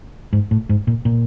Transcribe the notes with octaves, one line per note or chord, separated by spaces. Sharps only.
G#2
A2
G#2
A#2
A#2